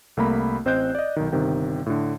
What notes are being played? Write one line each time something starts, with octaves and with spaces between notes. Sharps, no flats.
C2 A3 A#3 A#5 B5
A1 C4 C5 D#5 F#6 G6
D5 D#5
B1 D#3
G1 C3 D#3 G5
A2 D3